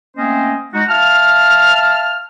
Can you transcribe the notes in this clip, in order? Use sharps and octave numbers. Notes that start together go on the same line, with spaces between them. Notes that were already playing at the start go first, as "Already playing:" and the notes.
A3 A#3 C4 C#4 C5 D#5
G#3 D#4 F#4
E5 F5 A5 F6